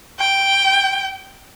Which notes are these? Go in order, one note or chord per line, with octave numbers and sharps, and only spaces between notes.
G5